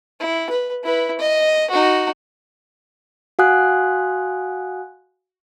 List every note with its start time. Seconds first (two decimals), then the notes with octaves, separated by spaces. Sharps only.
0.20 E4
0.50 B4
0.83 E4 B4
1.20 D#5
1.70 D#4 F#4
3.39 F#4 F5 F#5 G#5 D#6 F#6